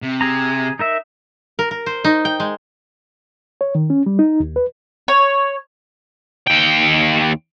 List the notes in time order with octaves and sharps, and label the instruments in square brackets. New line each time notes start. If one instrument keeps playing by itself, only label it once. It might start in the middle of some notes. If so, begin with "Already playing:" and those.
[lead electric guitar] C3
[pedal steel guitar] G#4 A#5
D#4 A#4 E5
[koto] A#4
A#4
C5
D#4
G5
G#3
[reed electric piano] C#5
D#3
C#4
G3
D#4
D#2
B4
[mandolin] C#5
[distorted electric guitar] D#2 G5